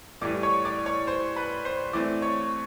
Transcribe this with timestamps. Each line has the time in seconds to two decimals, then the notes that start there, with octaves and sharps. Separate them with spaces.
0.21 A2 E3 G3 D5 D6
0.43 C#5 C#6
0.65 D5 D6
0.86 C#5 C#6
1.07 C5 C6
1.36 B4 B5
1.65 C5 C6
1.93 E3 A3 C4 D5 D6
2.22 C#5 C#6